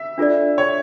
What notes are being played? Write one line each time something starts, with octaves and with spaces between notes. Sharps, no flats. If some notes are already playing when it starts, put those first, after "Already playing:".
Already playing: E5
D4 F4 A4 D5
C#5